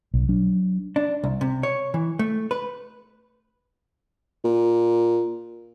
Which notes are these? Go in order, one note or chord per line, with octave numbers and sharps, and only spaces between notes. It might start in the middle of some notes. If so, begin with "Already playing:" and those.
B1
F#3 D4
D4
C2
C3
C#5
E3
A3
B4
A#2